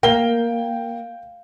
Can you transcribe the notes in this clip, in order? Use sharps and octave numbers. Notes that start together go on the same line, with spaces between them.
A#3 G5 G7